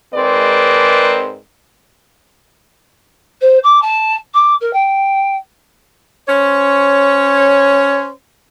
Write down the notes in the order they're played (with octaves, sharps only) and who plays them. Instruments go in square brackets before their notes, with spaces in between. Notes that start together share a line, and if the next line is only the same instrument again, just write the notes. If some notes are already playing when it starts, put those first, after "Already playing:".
[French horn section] G#2 G#3 C4 A#4 B4 D5
[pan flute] C5
D6
A5
D6
A#4
G5
[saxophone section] C#4 C5 C#5